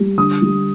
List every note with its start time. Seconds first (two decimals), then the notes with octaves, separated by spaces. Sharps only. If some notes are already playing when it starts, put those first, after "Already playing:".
Already playing: G3
0.18 D3 D#6
0.42 G3